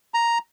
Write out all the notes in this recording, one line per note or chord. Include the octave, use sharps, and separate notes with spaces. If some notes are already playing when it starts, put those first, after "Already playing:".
A#5